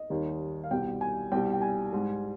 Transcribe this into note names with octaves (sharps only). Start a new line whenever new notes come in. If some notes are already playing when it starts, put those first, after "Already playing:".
Already playing: D#5
D#2 D#3 G3
F5
C2 B2 G3 G5
G#5
C2 B2 G3 G5
G5
G#5
G#2 G3